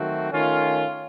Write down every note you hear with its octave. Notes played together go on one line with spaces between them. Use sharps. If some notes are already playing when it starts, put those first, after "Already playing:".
Already playing: D#3 F#3 A3 C4 F#4
D#3 A3 C#4 F4